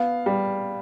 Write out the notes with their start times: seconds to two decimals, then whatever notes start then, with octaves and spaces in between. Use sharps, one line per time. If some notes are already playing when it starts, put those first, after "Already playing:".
Already playing: B3 F5
0.26 G3